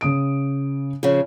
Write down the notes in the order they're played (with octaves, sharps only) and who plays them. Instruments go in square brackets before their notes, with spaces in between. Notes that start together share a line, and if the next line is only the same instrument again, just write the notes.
[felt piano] C#3 D#6 D7
[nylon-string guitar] C#3 F3 G#4